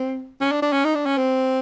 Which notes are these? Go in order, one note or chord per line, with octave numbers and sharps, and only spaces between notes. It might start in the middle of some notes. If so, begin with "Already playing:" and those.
Already playing: C4
C#4
D4
D4
C#4
D#4
D4
C#4
C4